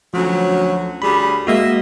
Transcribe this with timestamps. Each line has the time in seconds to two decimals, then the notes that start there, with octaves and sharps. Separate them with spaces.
0.14 D2 F3 F#3 C#4
1.02 D2 G3 G#4 B5
1.47 G#3 A#3 F#4 D#5 E5